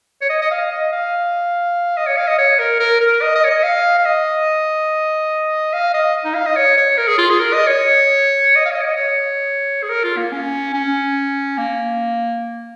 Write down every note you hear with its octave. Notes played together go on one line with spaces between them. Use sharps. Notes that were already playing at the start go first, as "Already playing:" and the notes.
C#5
D#5
D#5
F5
D#5
F5
D#5
C#5
F5
D#5
C#5
A#4
A#4
A#4
D#5
D#5
C#5
D#5
F5
F5
D#5
F5
D#5
D#4
F5
D#5
C#5
C#5
A#4
G#4
F4
G#4
A#4
D#5
C#5
D#5
F5
C#5
D#5
C#5
D#5
C#5
G#4
A#4
F4
A#3
C#4
C#4
A#3